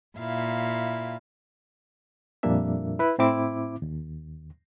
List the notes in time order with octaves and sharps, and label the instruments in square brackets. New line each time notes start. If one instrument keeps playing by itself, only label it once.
[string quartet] A#2 E4 F5
[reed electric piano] F2 A#2 G3 A#3 D4 E5
E4 B4
A2 C4 E4 D6
D#2